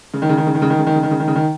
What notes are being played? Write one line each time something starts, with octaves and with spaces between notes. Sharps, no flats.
C#3
D#3
C#3
D#3
C#3
D#3
C#3
D#3
C#3
D#3
C#3
D#3
C#3
D#3
C#3
D#3